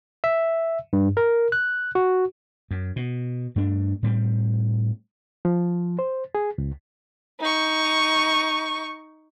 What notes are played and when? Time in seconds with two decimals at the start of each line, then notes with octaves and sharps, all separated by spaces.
0.24 E5
0.93 G2
1.17 A#4
1.52 F#6
1.95 F#4
2.71 F#2
2.96 B2
3.56 G2 A3 D4
4.03 A2 G3 B3 C4
5.45 F3
5.99 C5
6.35 G#4
6.58 C#2
7.40 D#4 C#6